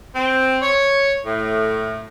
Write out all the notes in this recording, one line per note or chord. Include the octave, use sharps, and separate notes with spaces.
C4
C#5
A2